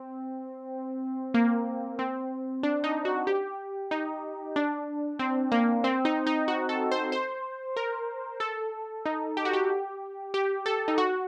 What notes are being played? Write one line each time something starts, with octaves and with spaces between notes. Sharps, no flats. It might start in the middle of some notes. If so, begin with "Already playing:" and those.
Already playing: C4
A#3
C4
D4
D#4
F#4
G4
D#4
D4
C4
A#3
C4
D#4
D#4
F#4
A4
C5
C5
A#4
A4
D#4
G4
F#4
G4
G4
A4
D#4
F#4